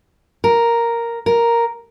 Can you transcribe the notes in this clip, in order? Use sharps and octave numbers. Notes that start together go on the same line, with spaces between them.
A#4
A#4